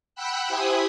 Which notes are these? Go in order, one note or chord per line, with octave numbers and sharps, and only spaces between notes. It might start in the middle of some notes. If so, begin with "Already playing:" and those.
F#5 G5 B5 E6 F#6
E4 G4 C5 G#5 B5 D#6